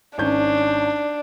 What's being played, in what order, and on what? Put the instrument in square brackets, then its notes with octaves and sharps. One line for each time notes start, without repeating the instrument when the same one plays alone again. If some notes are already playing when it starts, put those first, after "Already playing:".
[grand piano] G#1 C#4 G6 [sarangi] D4